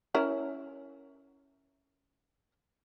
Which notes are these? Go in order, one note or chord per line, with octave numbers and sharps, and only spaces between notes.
C#4 E4 A#4